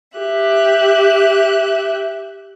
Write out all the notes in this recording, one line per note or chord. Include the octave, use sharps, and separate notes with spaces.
G4 E5 F#6